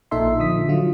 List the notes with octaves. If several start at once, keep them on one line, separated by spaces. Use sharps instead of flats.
A#1 A#2 D#4 A4 E5 C6
D3 F3 D#6 B6
D3 F#3 F4